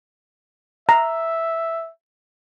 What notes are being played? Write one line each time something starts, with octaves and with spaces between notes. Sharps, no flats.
E5 A#5